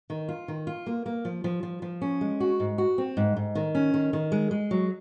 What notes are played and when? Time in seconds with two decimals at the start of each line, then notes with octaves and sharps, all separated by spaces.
0.10 D#3
0.28 F4
0.48 D#3
0.67 F4
0.86 A#3
1.06 A#3
1.25 F3
1.44 F3
1.63 F3
1.82 F3
2.02 C#4
2.21 G#3
2.40 F#4
2.60 G#2
2.78 F#4
2.98 C4
3.17 G#2
3.36 G#2
3.55 D#3
3.75 C#4
3.94 D#3
4.13 D#3
4.32 G#3
4.51 G#3
4.71 F#3